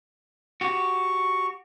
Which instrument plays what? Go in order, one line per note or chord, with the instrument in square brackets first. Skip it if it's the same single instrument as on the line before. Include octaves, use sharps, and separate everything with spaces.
[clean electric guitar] F#4 G4 [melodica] C#6